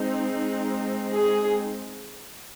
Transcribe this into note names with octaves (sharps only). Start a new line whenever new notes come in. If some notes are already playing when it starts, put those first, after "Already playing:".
Already playing: G#3 C4 D#4
G#4